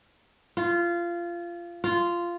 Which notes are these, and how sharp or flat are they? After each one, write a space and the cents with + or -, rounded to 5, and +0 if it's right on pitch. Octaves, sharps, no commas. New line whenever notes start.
F4 -20
F4 -10